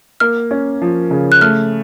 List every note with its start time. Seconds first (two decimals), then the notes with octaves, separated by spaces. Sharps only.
0.20 A#3 F6
0.51 C#4
0.82 F3
1.11 C#3
1.32 F#6
1.41 A3 F6